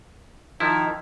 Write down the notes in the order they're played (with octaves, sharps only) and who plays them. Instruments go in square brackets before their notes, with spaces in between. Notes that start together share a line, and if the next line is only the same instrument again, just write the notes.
[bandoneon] D#3 D#4 [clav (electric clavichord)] F3 E4